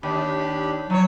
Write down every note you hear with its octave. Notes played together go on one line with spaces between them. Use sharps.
D#2 D4 G4 B5
F3 F#3 C#5